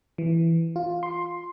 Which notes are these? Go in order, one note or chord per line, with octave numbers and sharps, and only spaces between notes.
E3
F4
C6